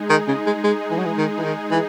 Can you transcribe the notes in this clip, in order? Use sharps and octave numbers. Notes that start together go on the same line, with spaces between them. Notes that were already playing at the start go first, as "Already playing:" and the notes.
Already playing: G#3 D#4 G#4
D#3
C#3
G#3
G#3
E3
F#3
E3
D#3
E3
D#3
E3